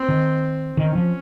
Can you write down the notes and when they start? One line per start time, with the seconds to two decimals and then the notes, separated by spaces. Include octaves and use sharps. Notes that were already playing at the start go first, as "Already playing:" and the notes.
Already playing: C4
0.08 D#3
0.77 D#3 C#4
0.95 F3